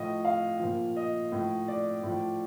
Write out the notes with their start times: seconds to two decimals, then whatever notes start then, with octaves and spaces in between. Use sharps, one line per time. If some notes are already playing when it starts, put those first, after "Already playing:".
Already playing: A2 F3 D#5
0.25 F5
0.60 A#2 F3
0.96 D#5
1.32 A2 F3
1.68 D5
2.03 A2 F3